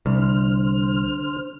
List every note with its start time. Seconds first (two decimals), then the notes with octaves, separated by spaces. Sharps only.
0.06 C2 D3 C5 F6